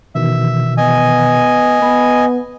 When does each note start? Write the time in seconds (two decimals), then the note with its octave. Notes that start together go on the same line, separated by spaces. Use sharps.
0.15 B2 D#3 E3 E5
0.77 B3 D#5 G#5
1.82 B3 B5